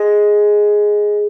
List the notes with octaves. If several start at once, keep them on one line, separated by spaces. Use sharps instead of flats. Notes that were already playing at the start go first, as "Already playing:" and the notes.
Already playing: G#3